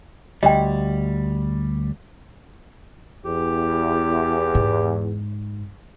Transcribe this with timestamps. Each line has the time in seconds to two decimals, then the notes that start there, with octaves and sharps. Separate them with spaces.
0.43 D2 G3 D#5 G5
3.25 E2 G4
4.55 G#2